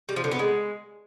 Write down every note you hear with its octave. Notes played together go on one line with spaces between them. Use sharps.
G3
F3
D3
B3
G#3